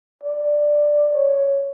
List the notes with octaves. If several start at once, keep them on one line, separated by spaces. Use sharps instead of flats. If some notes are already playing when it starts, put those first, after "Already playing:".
D5
C#5